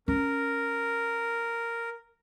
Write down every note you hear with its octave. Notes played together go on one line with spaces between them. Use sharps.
C#4 A#4